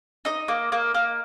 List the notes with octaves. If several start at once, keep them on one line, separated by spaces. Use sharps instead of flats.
D#4 D#5
A#3
A#3
A#3